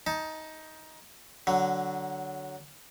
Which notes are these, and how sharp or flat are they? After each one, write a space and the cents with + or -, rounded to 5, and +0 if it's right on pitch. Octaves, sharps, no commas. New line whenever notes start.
D#4 +15 A5 +0
D3 +0 F#3 +15